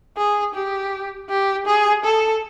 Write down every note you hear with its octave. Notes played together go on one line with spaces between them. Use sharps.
G#4
G4
G4
G#4
A4